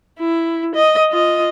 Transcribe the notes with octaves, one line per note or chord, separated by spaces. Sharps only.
E4
D#5
F4 D#5